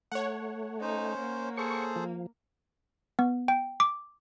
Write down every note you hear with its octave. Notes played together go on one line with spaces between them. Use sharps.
A3 C#5 F#5
C#4 D#4 C5
A#3
G#4 A4 C5 C#6
F3
B3
G5
D6